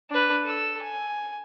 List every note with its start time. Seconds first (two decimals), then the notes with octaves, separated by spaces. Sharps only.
0.10 D4 B4
0.44 A4 E6
0.82 G#5